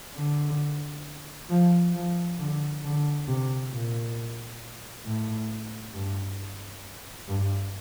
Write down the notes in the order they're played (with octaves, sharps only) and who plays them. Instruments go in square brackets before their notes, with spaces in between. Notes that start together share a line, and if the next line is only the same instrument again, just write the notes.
[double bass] D3
F3
F3
D3
D3
C3
A#2
A2
G2
G2